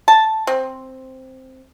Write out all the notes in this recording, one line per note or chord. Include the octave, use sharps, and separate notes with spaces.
A5
C4